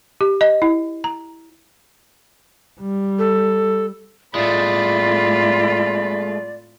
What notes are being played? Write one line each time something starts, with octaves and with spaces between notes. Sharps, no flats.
G4
D#5
E4
A#5
G3
A4
A2 G#3 A3 C4 F4 D5 B5